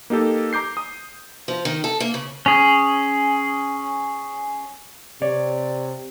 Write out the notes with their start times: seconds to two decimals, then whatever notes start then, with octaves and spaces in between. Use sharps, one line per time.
0.10 A#3 D#4 G4 A4
0.53 A#5 D6 G6 C7
0.77 D#6
1.48 F3
1.65 D#3
1.84 A4
2.00 A#3
2.14 C#3
2.46 C#4 G#4
5.22 C3 C#5 D5